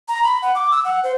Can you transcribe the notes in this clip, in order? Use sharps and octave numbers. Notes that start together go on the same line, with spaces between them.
A#5
B5
F#5
D6
E6
F#5
C5